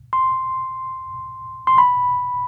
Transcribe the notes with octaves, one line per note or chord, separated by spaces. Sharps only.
C6
C6
B5